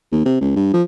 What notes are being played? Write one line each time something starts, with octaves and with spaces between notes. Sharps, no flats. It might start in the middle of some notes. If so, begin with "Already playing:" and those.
D#2
C3
C#2
G2
F3